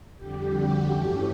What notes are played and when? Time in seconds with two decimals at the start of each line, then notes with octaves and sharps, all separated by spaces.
0.16 F2 D3 G3 G4
0.51 F#4
0.86 G2 E3 A3 C#4 G4